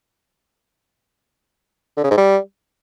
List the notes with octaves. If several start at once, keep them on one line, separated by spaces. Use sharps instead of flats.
D3
C#3
G#2
G3